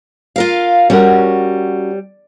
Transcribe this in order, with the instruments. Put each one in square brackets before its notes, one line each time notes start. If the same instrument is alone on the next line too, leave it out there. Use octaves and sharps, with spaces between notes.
[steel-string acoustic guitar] F4 A#4 F5
[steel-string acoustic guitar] G3 [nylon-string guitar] C#4 F#4 A#4